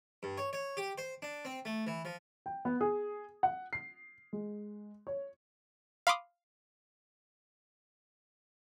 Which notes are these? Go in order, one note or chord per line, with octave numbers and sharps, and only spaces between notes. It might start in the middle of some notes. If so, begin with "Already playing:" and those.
G2
C#5
C#5
G4
C5
D4
C4
A3
E3
F3
G5
B3
G#4
F#5
C7
G#3
C#5
F5 B5 C6 D6 D#6